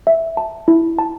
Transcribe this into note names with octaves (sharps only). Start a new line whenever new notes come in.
E5
A5
E4
A5